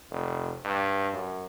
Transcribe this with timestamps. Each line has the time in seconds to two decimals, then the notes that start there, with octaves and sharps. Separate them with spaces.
0.10 F1
0.65 G2
1.14 F#2